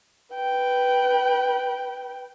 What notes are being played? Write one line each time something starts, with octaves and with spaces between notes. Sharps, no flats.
B4 G5